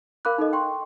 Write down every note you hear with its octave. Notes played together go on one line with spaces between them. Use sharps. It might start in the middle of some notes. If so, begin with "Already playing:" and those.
A#4 F5 B5 D6 F#6
D#4 A4 D#5
G5 C6 C#6